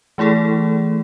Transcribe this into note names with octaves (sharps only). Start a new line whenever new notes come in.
E3 A3 E4 G#4 A4